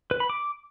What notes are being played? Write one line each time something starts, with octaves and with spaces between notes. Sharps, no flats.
B4
B5
D6